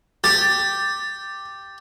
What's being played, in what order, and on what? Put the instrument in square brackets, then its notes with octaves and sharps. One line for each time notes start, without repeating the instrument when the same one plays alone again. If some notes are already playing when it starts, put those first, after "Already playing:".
[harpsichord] G4 [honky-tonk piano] A6